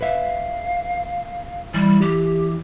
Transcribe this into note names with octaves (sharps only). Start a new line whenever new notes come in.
B4 E5 F5
E3 G3
G4